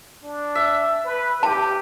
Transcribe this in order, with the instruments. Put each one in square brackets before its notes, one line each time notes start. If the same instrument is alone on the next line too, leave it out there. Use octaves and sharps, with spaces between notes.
[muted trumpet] D4
[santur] E5
[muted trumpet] B4
[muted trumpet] G4 [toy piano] A5